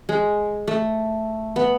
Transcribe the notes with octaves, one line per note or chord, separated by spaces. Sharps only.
G#3
A3
B3